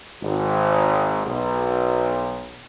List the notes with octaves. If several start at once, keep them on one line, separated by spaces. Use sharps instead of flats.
G#1
B1